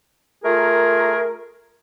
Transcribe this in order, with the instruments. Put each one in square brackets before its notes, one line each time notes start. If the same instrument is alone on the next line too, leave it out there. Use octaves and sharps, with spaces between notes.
[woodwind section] A3 F4 G#4 A#4